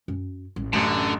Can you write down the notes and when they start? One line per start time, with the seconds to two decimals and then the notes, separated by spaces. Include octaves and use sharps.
0.08 F#2
0.56 A1
0.73 A1 F#2 D3 A3 E7